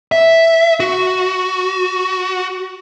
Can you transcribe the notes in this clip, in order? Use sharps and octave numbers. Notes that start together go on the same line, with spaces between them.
E5
F#4